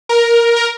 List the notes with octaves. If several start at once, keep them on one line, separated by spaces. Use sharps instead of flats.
A#4
A#4